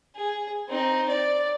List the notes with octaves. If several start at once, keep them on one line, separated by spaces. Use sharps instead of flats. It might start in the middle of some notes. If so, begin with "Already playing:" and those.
G#4
C4 D#4
D5